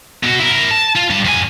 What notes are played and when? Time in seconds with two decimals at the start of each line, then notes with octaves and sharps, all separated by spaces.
0.23 B2 F#4
0.39 E4 A#4
0.71 A5
0.96 F4
1.10 G2 A5
1.25 F2 G#5